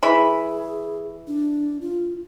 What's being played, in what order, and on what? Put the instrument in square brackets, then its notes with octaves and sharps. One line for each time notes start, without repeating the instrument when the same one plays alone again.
[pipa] E3 B5 [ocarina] G#4
[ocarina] D4
F4